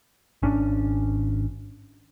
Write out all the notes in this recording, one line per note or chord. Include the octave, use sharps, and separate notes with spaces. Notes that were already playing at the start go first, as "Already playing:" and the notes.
G#1 C#4 D4